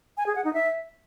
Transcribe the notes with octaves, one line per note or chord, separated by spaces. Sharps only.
G#5
G#4
F#5
D#4
E5